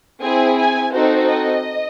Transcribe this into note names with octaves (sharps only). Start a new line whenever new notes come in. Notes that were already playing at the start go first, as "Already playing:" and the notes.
C4 E4 G#4 G#5
G#5
C4 D#4 F#4 A4 C5
D#5